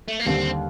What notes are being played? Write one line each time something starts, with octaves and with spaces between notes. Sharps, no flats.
A3
A#3
D#2 D3 G3 C4